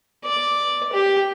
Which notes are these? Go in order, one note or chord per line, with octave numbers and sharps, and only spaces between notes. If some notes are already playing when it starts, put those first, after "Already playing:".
D5
G4